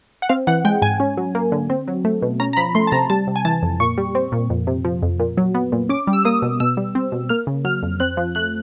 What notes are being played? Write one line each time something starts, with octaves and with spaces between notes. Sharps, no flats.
F#5
C4 F5
E3 F#5
G#3 G5
G#2 G#5
C#4
F#3
A#3
D3
C4
F#3
A3
B2
C#4 A#5
A#5
F3 B5
A3 C6
A5
C3 A#5
G3 A5
C3
G#5
E3 A5
F2
A#2 C#6
G3
C4
A#2
F2
C3
F3
F2
A#2
F#3
B3
A#2
C#4 D6
G3
E6
A#3 D#6
B2
B2 E6
G3
C4
B2
A#3 F6
C#3
F#3 F6
F2
C4 F#6
F3
A3 F#6